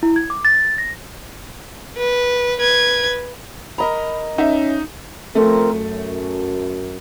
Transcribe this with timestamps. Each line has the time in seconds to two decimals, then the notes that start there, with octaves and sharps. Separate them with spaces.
0.03 E4
0.16 G#6
0.30 D6
0.45 A6
0.78 A#6
1.97 B4
2.60 B4 G#6
3.78 A#4 D#5 A#5 B5
4.38 C#4 D#4 E5
5.35 F3 A3 C4 A#4
5.72 F#2